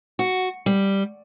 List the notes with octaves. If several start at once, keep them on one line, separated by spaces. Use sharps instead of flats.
F#4
G3